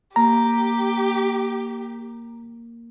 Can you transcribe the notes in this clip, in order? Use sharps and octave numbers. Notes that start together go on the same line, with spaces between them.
A#3 G4 A#5